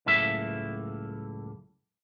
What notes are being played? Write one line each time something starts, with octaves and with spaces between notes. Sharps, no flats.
C#2 F#2 A2 A#3 E5